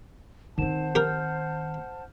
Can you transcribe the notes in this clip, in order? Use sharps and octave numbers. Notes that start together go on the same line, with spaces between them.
D#3 C4 D#4 C5 F#5 A5 E7
G4 A#4 F6 G6